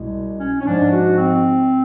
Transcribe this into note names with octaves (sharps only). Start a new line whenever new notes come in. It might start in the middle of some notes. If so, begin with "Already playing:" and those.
Already playing: C2 B2 G#3
C#4
C#4
G#2 F3 G#3 D4
F#4
C4